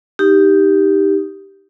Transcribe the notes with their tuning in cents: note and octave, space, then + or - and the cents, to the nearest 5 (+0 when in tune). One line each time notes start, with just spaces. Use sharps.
D#4 +0 G4 +0